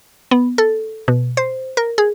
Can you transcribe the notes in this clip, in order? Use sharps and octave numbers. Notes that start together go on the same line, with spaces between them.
B3
A4
B2
C5
A#4
G#4